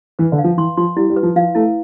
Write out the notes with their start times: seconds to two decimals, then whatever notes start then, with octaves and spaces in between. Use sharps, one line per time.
0.19 E3 B4
0.32 D3
0.38 F5
0.44 F3
0.57 E3 C6
0.77 F3 C6
0.96 G3 E4
1.10 G3
1.16 B4
1.23 F3
1.36 F3 F5
1.55 A3 E4